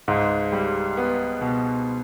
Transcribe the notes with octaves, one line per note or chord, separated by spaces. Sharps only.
C#2 G#2
G3
B3
B2